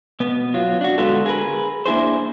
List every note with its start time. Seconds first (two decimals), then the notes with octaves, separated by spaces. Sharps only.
0.20 B2 B3
0.54 F#3 F4
0.81 D4 F#4
0.98 D3 G#3 B3 F4 F#4 A4
1.26 G#4 A#4 B4
1.86 A#3 D4 E4 G#4 C5